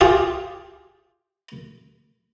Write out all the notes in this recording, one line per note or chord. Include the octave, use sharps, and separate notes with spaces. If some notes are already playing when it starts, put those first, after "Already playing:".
F4 G4 G#4